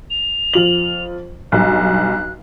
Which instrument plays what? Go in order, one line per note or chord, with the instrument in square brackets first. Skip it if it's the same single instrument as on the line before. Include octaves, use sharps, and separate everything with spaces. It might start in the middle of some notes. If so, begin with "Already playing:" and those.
[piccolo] F7
[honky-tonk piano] F2 F4 F#7
[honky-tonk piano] B1 G2 [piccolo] F#6